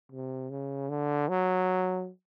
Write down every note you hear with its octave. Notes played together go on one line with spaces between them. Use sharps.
C3
C#3
D3
F#3